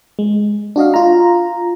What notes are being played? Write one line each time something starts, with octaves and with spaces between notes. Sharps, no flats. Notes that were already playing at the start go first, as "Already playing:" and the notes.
G#3
D4 F#4 D#5 F5
F4 A#5